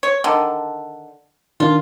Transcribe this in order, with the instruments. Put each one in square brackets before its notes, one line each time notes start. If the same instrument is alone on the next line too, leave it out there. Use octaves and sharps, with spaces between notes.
[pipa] C#5
D3 D#3
[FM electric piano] D#3 D4 [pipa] F4